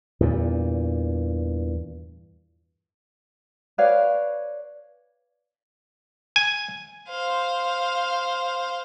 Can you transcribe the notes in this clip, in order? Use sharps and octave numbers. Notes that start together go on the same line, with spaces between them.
E2 G2 A#2
B4 C#5 D5 F5
G#5
C5 F5